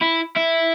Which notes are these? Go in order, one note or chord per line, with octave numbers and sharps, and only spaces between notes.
E4
E4